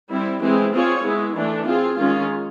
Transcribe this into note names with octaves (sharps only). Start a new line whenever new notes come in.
G3 C4 E4
E3 G#3 C4 E4
C4 F4 G#4 C#5
G#3 B3 E4
E3 A3 D4
C4 F4 G#4
D#3 G#3 C#4 F4